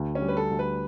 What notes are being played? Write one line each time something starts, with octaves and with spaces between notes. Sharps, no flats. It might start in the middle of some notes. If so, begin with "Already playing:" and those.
Already playing: D2
C#4
G3
B4
A4
D2
B4